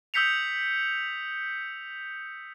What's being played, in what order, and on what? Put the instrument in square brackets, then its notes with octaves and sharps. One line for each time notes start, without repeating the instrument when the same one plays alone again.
[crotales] D#6 E6 G6 B6 C#7 F7